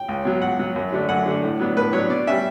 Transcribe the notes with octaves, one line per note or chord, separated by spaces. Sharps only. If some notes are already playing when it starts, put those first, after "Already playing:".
Already playing: G5
C#2
B2 F#3
C#2 F#5
B2 F#3
F#2
D3 A3 D4
F#2 F#5
D3 A3 D4
A2
F#3 B3 D4
A2 B4
F#3 B3 D4 C#5
B2 D5
G3 C#4 E5